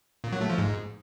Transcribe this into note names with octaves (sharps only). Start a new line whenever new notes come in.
A#2
F#3
A3
F3
G#2